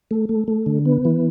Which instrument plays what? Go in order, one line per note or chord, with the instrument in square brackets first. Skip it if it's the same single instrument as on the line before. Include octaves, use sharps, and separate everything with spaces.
[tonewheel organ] A3
A3
A3
D3
B3
E3